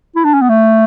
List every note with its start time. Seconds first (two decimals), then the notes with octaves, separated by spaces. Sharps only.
0.16 E4
0.24 D4
0.34 C#4
0.41 B3
0.49 A3